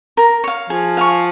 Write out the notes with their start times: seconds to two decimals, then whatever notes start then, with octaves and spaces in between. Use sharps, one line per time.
0.17 A#4
0.44 C#5 F5
0.70 F3 G#4
0.97 F5 G#5 C#6